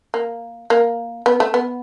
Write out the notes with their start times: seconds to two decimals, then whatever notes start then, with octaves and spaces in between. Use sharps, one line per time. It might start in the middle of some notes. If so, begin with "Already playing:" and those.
0.14 A#3
0.70 A#3
1.26 B3
1.40 A3
1.54 B3